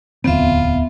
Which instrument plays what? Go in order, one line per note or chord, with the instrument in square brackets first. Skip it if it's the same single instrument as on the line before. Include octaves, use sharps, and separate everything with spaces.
[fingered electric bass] D1 E2 C4 [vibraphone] B3 E5 [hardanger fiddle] F4